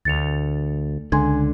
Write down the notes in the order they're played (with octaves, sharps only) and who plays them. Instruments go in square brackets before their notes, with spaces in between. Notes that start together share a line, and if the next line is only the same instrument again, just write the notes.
[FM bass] D2 [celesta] A6 C#7 F7
[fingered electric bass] C#2 D3 [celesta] G#5 C6 G#6